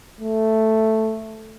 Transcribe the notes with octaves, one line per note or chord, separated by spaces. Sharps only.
A3